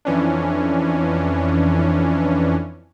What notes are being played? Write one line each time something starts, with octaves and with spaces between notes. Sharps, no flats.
F2 E3 C#4 D4